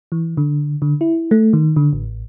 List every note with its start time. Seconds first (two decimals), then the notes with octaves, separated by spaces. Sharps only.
0.12 E3
0.37 D3
0.82 D3
1.01 E4
1.31 A3
1.53 D#3
1.76 D3
1.93 A1